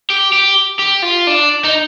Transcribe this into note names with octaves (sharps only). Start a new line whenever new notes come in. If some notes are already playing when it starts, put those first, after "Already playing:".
G4
G4
G4
F4
D4
D#4